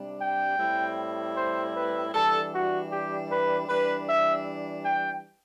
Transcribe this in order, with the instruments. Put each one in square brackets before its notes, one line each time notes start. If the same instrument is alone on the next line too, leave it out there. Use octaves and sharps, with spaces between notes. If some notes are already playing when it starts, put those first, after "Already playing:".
Already playing: [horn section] C3 G3 D4
G5
A2 G3 C4 E4
C5
B4
E3 G3 D4 A4
F#4
G4
B4
E3 G3 D4 B4
E5
G5